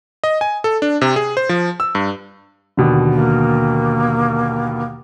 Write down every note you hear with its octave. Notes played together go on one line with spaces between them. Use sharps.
D#5
G#5
A4
D4
C3
G#4
C5
F3
E6
G2
D#2 B2 D3
A#3